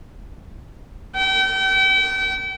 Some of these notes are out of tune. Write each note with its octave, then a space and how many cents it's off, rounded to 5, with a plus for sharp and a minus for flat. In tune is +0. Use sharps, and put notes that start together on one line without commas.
G5 -35